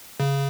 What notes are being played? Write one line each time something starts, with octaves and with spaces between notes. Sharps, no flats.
C#3